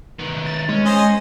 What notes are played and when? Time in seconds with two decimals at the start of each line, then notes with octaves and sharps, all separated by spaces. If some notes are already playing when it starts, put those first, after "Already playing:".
0.19 D#3 B3
0.46 A6
0.69 G#3 C#4
0.85 C5 D#5 G#5